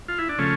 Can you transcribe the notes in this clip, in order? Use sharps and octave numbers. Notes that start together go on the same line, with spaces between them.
F4
E4
D4
C#3 F3 A3 C#4